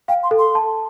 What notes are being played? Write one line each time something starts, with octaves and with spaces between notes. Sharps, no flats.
F5 G5
C6
A4
C6
A5